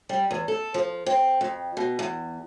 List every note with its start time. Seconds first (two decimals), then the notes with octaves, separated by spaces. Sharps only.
0.09 G3
0.31 E2
0.48 A4
0.74 F3
1.06 C4
1.41 F2
1.77 B2
1.99 E2